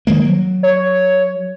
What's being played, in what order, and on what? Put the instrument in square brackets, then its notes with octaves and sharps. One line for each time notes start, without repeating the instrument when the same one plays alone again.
[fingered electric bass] D#3 G#3 A#3
F#3
[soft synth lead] C#5